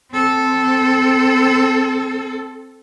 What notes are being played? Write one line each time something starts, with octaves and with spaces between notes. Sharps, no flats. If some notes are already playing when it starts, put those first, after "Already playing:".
C4 A4